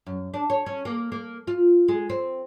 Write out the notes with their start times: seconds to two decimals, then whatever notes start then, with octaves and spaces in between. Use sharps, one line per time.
0.06 F#2
0.34 D4
0.50 C#5
0.66 C#4
0.85 A#3
1.12 A#3
1.47 F4
1.88 G#3
2.10 C4